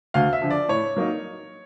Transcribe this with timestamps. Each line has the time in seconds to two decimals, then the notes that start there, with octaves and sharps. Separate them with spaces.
0.14 D2 F5
0.33 E5
0.42 D3 F3
0.51 D5
0.69 A2 C#5
0.96 F#3 A#3 D#4